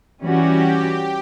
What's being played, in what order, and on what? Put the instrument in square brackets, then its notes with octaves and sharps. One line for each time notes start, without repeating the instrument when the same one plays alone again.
[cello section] E3 G3 C#4 F#4 [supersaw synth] G4